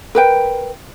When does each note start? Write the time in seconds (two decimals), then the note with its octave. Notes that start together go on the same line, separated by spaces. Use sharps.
0.15 A#4 B4 G5